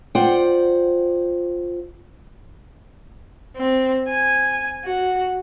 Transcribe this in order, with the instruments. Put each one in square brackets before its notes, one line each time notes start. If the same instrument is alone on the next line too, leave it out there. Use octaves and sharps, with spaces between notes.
[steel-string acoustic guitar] F4 C5 D5 F#5 G5
[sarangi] C4
G#5
F#4